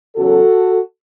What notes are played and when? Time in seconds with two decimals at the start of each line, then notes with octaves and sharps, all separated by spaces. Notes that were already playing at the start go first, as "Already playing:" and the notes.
0.16 E2 C#3 F#3 F#4 A4